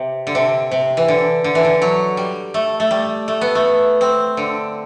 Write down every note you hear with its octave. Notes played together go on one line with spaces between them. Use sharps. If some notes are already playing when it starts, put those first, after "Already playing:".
Already playing: C3
D3
C3
C3
E3
D3
D3
E3
D3
F#3
G3
A3
A3
G3
A3
B3
A3
C4
D3